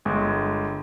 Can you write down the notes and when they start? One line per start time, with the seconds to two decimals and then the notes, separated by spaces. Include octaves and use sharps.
0.05 G1 G#3